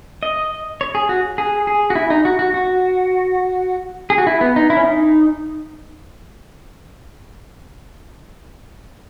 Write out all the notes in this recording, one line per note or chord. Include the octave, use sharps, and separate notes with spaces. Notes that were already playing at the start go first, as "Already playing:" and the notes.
D#5
C#5
G#4
F#4
G#4
G#4
F#4
E4
D#4
F#4
F#4
F#4
G#4
F#4
E4
B3
D#4
E4
C#4
D#4